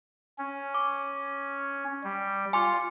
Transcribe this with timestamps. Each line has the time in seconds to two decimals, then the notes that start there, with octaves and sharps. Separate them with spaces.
0.38 C#4
0.75 D6
2.04 G3
2.53 F4 G#5 C6 D6